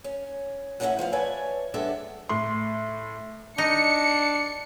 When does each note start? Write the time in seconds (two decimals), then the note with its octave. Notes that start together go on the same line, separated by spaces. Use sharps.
0.04 C#4
0.80 A2 F#3 C#4 D#4 E4 F#5
0.99 F3 B3 F5
1.13 B4 C#5 D5 E5 G#5 A5
1.74 G3 G#3 B3 D4 A4 E5
2.29 A2 C6
3.58 D4 D#4 C#7